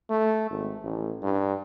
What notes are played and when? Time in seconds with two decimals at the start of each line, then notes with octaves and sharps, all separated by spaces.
0.10 A3
0.50 G#1
0.83 A1
1.23 G2